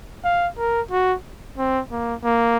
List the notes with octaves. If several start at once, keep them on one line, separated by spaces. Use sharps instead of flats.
F5
A#4
F#4
C4
A#3
A#3